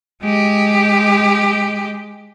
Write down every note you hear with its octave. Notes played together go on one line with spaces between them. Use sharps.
G#3 G4